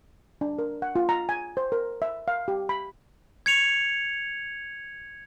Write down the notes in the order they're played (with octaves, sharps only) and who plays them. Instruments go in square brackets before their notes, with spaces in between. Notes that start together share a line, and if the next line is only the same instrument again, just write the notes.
[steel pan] D4
A#4
F#5
F4
A#5
G#5
C5
A#4
E5
F5
G4
B5
[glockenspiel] G#6 C#7 F7